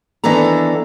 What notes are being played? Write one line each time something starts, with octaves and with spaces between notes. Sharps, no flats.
D#3 E3 B3 D4 A4 A#5